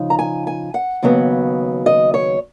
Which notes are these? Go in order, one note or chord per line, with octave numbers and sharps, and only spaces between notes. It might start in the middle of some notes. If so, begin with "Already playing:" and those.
Already playing: C#3 F3 D#4
A#5
G#5
G#5
F#5
D#2 C#3 F#3 B3
D#5
C#5